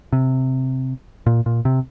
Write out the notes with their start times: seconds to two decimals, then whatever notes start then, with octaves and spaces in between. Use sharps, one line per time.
0.13 C3
1.26 A#2
1.46 A#2
1.65 C3